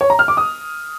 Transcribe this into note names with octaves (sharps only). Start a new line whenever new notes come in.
C#5
A#5
F6
D6
D#6